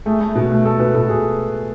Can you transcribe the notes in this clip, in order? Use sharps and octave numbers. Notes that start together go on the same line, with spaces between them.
A3 G#4
A3
B2
A3
A3 A4
B2 B4
B2 A4
B2 G#4